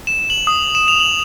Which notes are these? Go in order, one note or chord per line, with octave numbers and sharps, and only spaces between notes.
E7
F#7
D#6
E7
F7
F#7